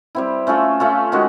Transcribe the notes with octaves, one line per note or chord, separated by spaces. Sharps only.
G3 C4 E4
A3 C#4 F4 A4
A3 C#4 F4 A4
D#3 G#3 C#4 F#4